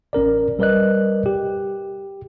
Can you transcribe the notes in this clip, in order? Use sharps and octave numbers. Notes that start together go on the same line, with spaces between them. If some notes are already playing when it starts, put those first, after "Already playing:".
A1 C#4 A#4 D5
G3 A#4 B4 D5 D#5 F#6
G4